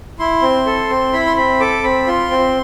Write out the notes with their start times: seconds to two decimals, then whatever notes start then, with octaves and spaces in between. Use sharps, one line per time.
0.19 E4 C6
0.42 C4
0.66 A4
0.90 C4
1.13 E4 B5
1.26 C6
1.36 C4 B5
1.60 A4 D6
1.83 C4 B5
2.07 F4 C6
2.31 C4